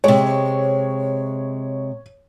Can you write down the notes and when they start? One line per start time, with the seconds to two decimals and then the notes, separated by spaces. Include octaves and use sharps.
0.04 C3 G#3 C#5